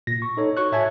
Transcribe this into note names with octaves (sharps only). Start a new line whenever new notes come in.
A#2 A#6
C#6
D#4 A4 C#5
F#4 C#5 C#6 F#6
A2 C#5 E5 G#5 A5 G#6